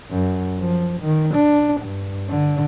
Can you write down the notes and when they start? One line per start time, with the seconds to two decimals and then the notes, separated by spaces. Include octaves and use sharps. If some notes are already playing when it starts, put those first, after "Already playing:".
0.11 F#2
0.59 F3
1.01 D#3
1.35 D4
1.81 G2
2.29 D3